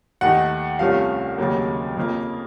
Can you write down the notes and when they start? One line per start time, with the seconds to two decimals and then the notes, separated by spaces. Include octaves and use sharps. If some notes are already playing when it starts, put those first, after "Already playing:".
0.21 D#2 D#3 A3 D#4 F#5
0.79 C2 C3 F3 A3 C#4 F5
1.38 F1 D#2 C#3 F#3 A#3
1.96 F2 C#3 F3 A#3